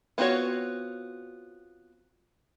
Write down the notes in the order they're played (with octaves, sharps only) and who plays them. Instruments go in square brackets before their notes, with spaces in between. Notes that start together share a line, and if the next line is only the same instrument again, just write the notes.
[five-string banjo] B3 C4 F4 F#4 C#5